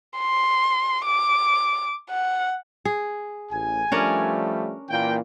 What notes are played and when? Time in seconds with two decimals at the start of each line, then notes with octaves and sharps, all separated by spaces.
0.19 C6
1.06 D6
2.10 F#5
2.85 G#4
3.51 A1 G#5
3.92 F3 G3 A3 C#4 D4 A#4
4.90 A#2 E3 A#3 G5